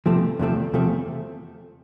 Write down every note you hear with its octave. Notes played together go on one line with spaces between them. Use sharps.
E2 C3 F3 A3 C4
E2 C3 F3 A3 C4
E2 C3 F3 A3 C4